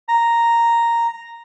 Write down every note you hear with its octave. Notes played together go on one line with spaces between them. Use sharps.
A#5